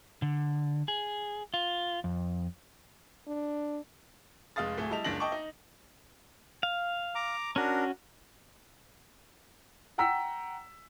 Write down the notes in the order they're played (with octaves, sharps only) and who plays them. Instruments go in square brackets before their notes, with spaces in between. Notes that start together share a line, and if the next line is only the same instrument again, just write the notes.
[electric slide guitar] D3
G#4
F4
F2
[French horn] D4
[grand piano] F1 G#3 F5 D#6 A6
D1 A3 G#4
G3 E4 D#5 A5 F7
F#1 C#2 D4 A#6 F#7
D#5 G5 A5 C#6 D6
D#4
[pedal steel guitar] F5
[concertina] A#5 D6
[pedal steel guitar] C#4 F#4 [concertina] D4 A#4
[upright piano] F#5 G5 A#5 E6 B6